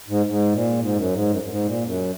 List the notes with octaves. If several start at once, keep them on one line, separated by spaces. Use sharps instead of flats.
G#2
G#2
A#2
G#2
F#2
G#2
F#2
F#2
G#2
A#2
F#2